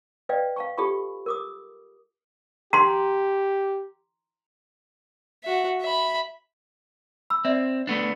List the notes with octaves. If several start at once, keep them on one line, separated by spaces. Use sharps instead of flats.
B4 D5 D#5 F5 G5
F5 A5 C#6
F4 G4 A4 A5 B5 C#6
A#4 D6 D#6
G4 A#5 C6
F#4 E5
E5 B5
B5 E6
C4 D5 E5
A3 B3 D4